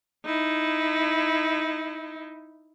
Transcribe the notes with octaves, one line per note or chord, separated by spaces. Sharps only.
D#4 E4